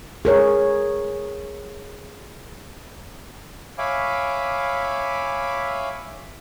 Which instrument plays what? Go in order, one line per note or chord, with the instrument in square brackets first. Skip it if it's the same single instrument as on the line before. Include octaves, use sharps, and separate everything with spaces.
[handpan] G#4 A#4 C#5
[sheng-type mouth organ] C#5 E5 F5 G#5 B5 D6